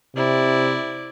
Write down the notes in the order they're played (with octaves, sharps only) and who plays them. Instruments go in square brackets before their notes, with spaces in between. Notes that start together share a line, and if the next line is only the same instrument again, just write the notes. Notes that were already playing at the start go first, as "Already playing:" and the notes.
[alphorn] C3 [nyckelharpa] E4 D5